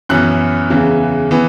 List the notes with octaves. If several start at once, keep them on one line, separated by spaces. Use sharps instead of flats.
F#2 E3 B3 F#6
E2 C#3 E3
E3 B3